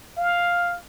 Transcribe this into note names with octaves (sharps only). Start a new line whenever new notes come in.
F5